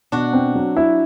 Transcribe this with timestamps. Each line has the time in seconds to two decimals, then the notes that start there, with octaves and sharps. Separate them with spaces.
0.12 B2 D4 F#4
0.33 C4
0.55 F#3
0.76 E4